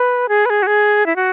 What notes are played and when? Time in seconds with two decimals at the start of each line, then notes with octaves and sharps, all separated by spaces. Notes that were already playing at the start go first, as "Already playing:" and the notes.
Already playing: B4
0.29 G#4
0.46 B4
0.50 G#4
0.63 F#4
0.67 G#4
1.06 E4
1.16 F#4